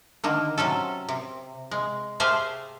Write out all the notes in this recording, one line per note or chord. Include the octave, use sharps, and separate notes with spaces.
D3 D#3 A#3
C3 F#3 C#4 A4
C3
G#3
A3 G4 G#4 C5 F5 G#5